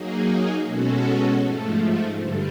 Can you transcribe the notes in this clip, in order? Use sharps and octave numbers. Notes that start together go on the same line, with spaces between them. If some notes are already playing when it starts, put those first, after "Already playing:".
Already playing: F#3 A#3 D#4 G#4
B2 G#3 C#4 F#4 A4
G#2 F3 A3
G2 D3 G3